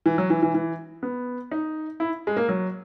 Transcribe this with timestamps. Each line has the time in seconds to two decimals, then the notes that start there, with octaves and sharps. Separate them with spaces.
0.06 E3
0.18 F#3
0.30 E3
0.43 E3
0.54 E3
1.03 B3
1.51 D#4
2.00 E4
2.27 G#3
2.37 A#3
2.49 F#3